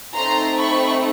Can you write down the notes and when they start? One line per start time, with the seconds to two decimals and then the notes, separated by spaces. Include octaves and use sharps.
0.15 A3 C4 D#4 A#5 C6
0.57 B5 C#6